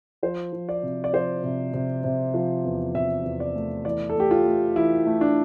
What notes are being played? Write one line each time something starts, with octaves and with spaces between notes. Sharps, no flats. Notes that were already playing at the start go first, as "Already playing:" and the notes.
F3 C5
F3
D5
C3
D5
F3 C5
C3
C3
C3
F3
E2
C3 E5
E2
D5
A3
E3 D5
A4
A3 G4
F4
A3
E3 E4
A3
D4